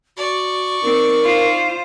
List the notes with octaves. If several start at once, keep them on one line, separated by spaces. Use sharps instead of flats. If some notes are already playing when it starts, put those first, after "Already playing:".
F#4 D5 C#6
C4 D#4 A#4
F4 C5